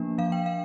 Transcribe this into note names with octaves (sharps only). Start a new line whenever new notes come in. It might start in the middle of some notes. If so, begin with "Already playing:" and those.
Already playing: F3 A#3 D4
F3 F5
G5
F5